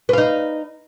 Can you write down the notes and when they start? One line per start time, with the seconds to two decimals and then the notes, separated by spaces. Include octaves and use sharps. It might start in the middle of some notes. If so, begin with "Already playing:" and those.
0.09 B4
0.13 F5
0.18 D#4